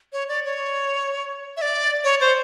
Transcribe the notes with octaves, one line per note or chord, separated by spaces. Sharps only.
C#5
D5
C#5
E5
D5
C#5
C5